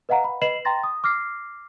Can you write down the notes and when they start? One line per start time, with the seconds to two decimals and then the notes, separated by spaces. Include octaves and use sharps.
0.09 B4 D#5 F5 F#5 A#5
0.24 B5
0.42 B4 D#5 B5 C7 E7 F#7
0.65 G5 A#5 C6 A6 A#6
0.83 D#6
1.04 D6 F6 A#6 C7